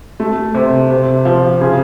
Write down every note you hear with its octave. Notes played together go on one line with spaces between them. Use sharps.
A3
C3
C3
F3
C#3